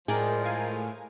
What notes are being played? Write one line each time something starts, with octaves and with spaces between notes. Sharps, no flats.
A2 F3 G#3 G#4 A#4 D5 G5
A#4 F5 G#5